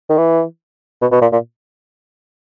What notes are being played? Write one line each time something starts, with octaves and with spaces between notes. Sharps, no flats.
D#3
E3
B2
B2
A#2
A#2